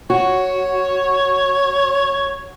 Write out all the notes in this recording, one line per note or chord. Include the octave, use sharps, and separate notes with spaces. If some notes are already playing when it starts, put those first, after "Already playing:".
F#4 C#5